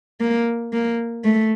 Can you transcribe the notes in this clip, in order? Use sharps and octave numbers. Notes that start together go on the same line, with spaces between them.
A#3
A#3
A3